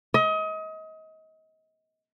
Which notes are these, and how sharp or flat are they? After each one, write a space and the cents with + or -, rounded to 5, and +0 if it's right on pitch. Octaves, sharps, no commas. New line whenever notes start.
D#5 +30